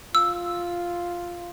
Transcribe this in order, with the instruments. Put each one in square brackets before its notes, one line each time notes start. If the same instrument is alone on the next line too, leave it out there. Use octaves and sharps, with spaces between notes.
[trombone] F4 [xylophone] E6